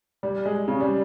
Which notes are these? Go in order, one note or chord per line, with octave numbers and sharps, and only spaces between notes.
G3
G#3
C#3
G3